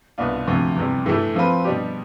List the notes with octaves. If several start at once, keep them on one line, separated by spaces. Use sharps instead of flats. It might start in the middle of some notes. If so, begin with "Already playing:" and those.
C2 B2 B3 D4 F4
D2 C3 F3
E2 C3 G3
A2 E3 A3 E4
F3 C4 F4 B4
B2 G3 D4 G4